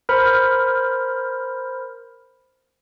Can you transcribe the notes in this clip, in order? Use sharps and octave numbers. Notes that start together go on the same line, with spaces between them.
A#4 C5 B5 F6